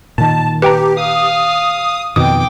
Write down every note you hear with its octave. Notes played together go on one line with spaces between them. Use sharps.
A#2 D#3 A5
G4 B4 G5 A#5
F5 D#6
F2 B2 D#3 G5 D6 D#6